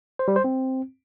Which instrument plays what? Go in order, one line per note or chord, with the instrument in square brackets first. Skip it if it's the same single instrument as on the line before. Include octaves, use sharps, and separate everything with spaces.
[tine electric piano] C5
G3
C5
C4